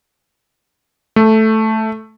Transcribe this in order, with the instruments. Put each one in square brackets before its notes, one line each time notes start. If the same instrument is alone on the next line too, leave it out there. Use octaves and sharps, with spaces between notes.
[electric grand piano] A3